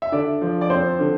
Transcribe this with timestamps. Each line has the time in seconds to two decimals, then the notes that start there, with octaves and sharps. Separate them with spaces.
0.02 E5
0.12 D3 D5
0.42 F3
0.61 D5
0.70 C4 C5
0.99 D3